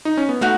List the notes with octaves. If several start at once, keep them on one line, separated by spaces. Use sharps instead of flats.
D#4
C#4
B3
A3 D#4 F#4